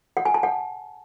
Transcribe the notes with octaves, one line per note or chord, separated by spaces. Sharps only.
F#5
G#5
A5
F#5